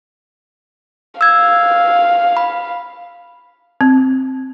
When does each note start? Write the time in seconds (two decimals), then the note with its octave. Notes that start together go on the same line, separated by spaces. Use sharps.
1.21 F5 E6 G#6
2.37 B5
3.81 C4